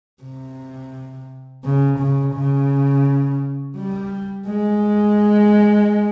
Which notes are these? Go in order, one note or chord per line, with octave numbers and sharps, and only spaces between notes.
C3
C#3
C#3
C#3
G3
G#3